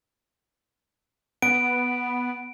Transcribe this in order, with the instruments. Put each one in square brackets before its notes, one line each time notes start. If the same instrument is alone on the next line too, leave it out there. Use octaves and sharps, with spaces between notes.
[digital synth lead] B3 [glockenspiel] D7